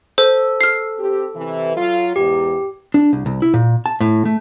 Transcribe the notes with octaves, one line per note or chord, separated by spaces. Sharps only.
A4 C5
F6 C7
C4 G4
C3 E3
F#3 F4
E2 G#2 G4
D4
C2
C2
E4
A#2
A5
A2
A3